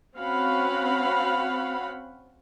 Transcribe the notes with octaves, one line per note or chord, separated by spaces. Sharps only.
C4 C#4 F#4 F5 F#5 B5